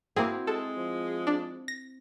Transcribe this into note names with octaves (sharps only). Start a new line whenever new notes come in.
A#3 C4 E4 F#4 G#4
G#3 A4
F3
D4
A#6